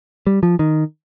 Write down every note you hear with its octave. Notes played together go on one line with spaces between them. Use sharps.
G3
F3
D#3